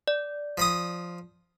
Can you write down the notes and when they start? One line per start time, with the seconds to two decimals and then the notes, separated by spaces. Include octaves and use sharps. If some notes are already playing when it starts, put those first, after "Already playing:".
0.08 D5
0.58 F3 B5 D#6